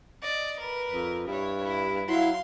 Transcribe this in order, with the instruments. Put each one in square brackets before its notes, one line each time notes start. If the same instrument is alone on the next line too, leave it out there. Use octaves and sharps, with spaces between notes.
[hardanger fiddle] D5 D#5
A#4 B4
[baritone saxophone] F2
[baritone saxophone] G2 [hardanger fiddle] E4 C#5
[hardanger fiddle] E4
[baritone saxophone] F#3 [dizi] E4 [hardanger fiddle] F5 C6